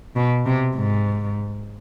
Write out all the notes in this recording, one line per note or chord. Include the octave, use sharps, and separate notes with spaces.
B2
C3
G#2